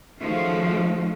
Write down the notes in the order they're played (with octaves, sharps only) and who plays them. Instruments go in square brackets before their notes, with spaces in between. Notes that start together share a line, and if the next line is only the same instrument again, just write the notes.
[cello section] D#3 F3 G#3 A3 C#4 F#4